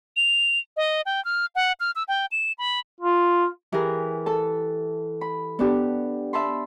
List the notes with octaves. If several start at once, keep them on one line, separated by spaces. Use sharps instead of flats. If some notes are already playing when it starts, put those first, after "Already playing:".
F7
D#5
G5
F6
F#5
F6
E6
G5
E7
B5
F4
E3 G4 G#4 A#4
A4 A5
B5
B3 D4 G4
E5 A5 B5 C6